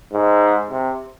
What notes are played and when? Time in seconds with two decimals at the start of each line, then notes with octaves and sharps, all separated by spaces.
0.13 G#2
0.70 C3